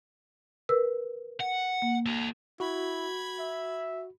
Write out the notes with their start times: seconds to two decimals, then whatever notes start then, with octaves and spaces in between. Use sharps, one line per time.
0.69 A#4 B4 E6
1.40 F#5
1.82 A#3
2.06 F#4 A4
2.60 E4 F#4 B5 G#6
3.39 E5